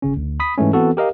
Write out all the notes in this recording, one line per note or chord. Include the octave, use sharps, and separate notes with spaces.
G1 C#3 C#4
D2
B5 D#6 B6
G#2 E3 G#3 A3 C#4
E3 B3 C4 F#4 A4
G4 A#4 D#5 F5